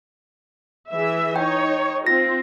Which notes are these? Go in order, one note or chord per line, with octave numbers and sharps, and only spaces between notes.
E3 G#4 E5
D#4 C#5 G5
C4 F4 A#6